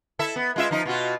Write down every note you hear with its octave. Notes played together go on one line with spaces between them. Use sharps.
E4 A4 E5
B3
G#3 F4 E5
F3 D#4
B2 F4 F#4